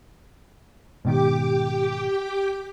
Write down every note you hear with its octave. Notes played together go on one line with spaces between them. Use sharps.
G#2 B2 D#3 G4 G5 D6